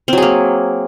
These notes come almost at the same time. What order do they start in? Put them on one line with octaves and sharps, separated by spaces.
C4 F#3 G#4 A#3